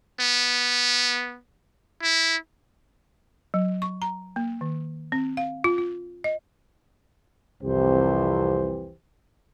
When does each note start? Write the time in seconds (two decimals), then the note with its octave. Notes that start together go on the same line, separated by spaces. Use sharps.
0.20 B3
2.02 E4
3.54 F#3
3.82 C#6
4.02 A#5
4.36 A#3
4.61 D#3
5.12 C4
5.37 F5
5.64 F4
5.78 F4
6.24 D#5
7.62 C2 F2 C3 E3 G4 C5